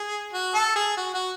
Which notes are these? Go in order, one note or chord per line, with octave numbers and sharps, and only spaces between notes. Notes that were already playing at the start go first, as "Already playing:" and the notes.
Already playing: G#4
F#4
A4
G#4
F#4
F#4